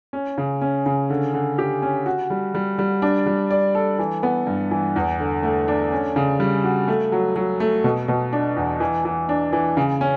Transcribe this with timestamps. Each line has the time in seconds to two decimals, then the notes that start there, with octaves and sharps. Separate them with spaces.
0.13 C#4
0.38 C#3
0.62 C#4
0.86 C#3
1.10 D3
1.34 D3
1.58 G4
1.82 C#4
2.06 F#4
2.30 G3
2.55 G3
2.79 G3
3.02 D4
3.26 G3
3.51 D5
3.75 A4
3.99 E3
4.23 B3
4.47 G2
4.71 E3
4.96 E2
5.20 D3
5.43 A3
5.68 D4
5.92 C#4
6.16 C#3
6.40 G3
6.64 F#4
6.88 A3
7.12 F#3
7.36 F#3
7.60 A3
7.84 B2
8.08 B2
8.33 D4
8.56 E2
8.80 E3
9.05 E3
9.29 D4
9.53 E3
9.77 C#3
10.01 C#4